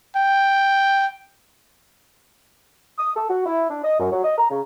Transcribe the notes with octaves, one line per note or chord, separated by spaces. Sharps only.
G5
D#6
A4
F#4
E4
D4
D#5
F#2
F#3
D#5
A#5
C#3